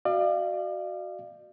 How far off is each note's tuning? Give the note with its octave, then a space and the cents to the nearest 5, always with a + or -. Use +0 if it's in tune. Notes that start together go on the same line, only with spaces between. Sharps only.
F#4 +0 D5 +40 F5 -30